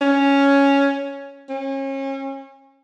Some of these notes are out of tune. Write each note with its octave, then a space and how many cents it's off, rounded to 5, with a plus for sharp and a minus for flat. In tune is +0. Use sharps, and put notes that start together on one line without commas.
C#4 +5
C#4 -35